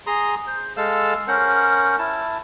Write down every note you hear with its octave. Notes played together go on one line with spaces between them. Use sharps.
G#4 A#5 C6 D#6
C5
G#3 A4 F5 E6
C#4 A#4 C5 F#5
E4 A5